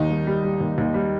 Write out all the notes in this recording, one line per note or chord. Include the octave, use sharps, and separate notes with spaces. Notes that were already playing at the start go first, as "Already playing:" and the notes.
Already playing: D#2 D#3 D#4
G3
G3
G3
D#2
D#2
G3